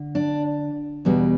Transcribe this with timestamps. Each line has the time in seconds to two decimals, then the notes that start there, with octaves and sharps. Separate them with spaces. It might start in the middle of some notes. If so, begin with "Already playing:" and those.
Already playing: D3
0.15 D4
1.05 E2 B2 G3